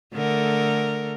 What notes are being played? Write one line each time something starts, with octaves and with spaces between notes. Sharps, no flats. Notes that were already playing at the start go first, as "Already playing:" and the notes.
D3 A3 A#4